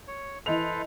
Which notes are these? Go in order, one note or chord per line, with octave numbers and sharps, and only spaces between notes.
C#5
E3 A4 B4 C5 D#5 F7